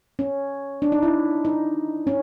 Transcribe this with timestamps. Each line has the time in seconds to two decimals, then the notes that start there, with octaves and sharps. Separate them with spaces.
0.19 C#4
0.82 D4
0.92 D#4
1.03 E4
1.45 D#4
2.07 C#4